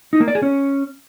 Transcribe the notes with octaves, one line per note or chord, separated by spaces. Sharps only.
D#4
A#3
D5
G#4
C#4